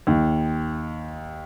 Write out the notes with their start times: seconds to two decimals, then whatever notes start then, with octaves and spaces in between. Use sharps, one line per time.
0.07 D#2